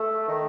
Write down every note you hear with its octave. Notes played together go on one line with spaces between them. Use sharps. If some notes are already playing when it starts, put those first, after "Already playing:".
Already playing: A3
D#3